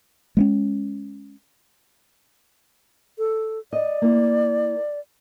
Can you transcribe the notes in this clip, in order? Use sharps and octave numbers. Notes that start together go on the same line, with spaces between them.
G#3 A#3 C#4
A4
D5 D#5
A#3 E4